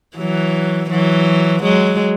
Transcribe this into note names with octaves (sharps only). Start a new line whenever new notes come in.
E3 F#3
E3 F#3
F#3 G#3